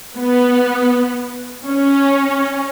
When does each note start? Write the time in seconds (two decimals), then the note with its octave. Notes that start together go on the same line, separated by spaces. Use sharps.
0.17 B3
1.66 C#4